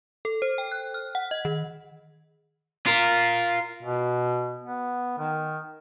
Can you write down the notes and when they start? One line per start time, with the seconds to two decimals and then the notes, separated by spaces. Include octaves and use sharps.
0.25 A4
0.42 C5
0.58 G5
0.72 F#6
0.94 F6
1.15 F#5
1.31 D#5
1.45 D#3
2.86 F4 A#4
3.83 B2
4.64 B3
5.18 D#3